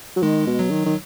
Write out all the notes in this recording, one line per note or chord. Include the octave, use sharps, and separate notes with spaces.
F#3
D#3 G#3
B2
F#3
D#3
D#3